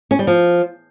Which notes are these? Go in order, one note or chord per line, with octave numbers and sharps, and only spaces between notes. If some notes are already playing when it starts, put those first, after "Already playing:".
C#4
G3
F3